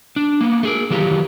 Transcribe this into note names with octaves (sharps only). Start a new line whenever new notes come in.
D4
A#3 B3
A3 G#4 A#4
D#3 E3 F#3 F4 G4